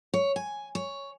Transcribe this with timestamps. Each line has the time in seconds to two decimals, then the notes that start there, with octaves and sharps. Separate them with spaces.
0.14 C#5
0.36 G#5
0.75 C#5